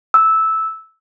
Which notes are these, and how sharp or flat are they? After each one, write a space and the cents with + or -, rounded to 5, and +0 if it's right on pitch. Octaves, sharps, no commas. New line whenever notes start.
E6 -10